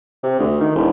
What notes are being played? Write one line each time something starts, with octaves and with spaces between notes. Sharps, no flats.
C3
D2
D#3
E1